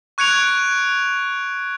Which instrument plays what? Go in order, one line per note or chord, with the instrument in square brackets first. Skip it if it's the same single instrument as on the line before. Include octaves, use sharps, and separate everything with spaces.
[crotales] C#6 F#6 G#6 C#7 D7 F7